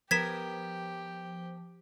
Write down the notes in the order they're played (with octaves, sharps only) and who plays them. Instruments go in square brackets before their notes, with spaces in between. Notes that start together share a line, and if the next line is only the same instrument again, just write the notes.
[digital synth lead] F3 [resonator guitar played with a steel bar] B3 A#4 [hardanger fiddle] G4 [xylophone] G#6 B6 E7